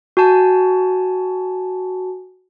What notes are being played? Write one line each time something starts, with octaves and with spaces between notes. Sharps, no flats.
F#4 G#5 A5